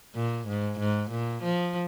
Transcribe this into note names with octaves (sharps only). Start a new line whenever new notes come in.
A#2
G#2
G#2
A#2
F3